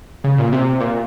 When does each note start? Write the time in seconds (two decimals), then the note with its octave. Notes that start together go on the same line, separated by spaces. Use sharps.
0.24 C#3
0.38 A#2
0.52 C3
0.80 A#2